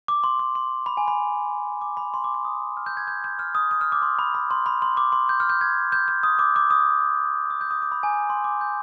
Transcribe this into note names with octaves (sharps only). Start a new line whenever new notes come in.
D6
C6
D6
C6
B5
G#5
B5
D6
B5
C6
D6
D6
D#6
F6
G6
G#6
G6
G6
F6
D#6
D#6
F6
D6
C6
B5
B5
C6
B5
C6
D6
C6
G6
F6
G6
G#6
G6
G6
D#6
D6
D6
D#6
D#6
G6
D#6
D6
B5
G#5
B5
C6
D6
G6